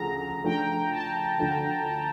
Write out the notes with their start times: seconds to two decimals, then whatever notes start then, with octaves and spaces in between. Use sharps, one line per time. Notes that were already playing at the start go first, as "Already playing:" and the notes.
Already playing: D2 C#3 F3 A#5
0.44 F3 A3 D4 G5
0.91 A5
1.38 D2 D3 F3